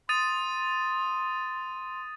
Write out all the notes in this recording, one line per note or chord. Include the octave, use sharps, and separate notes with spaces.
C6 D#6 A6 D#7